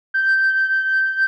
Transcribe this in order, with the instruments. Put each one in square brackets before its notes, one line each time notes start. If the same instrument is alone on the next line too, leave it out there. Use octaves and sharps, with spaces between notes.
[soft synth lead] G6